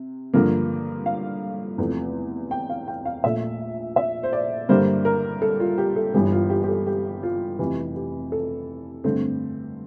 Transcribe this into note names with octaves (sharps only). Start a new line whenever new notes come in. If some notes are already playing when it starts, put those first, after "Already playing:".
Already playing: C3
G2 D3 F3 A#3
F5
E2 C3 F3 A3
G5
F5
G5
F5
A#1 A#2 A3 E5
E5
C5
D5
G2 D3 G3 A#3 D4 C5
A#4
A4
F4
G4
A4
G1 G2 E3 G4
F4
G4
G4
A4
G4
F4
F1 F2 E3 G4
G4
A4
G2 D3 A3 C4